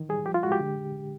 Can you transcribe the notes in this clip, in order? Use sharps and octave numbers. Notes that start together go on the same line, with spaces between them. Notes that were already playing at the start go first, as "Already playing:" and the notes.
Already playing: D#3 E3
G3 G#4
F3 G4
F4
G#3 F#4
G4
D3